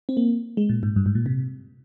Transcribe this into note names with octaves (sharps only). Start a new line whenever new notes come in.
C4
A#3
G#3
A#2
G#2
G2
G#2
A#2
C3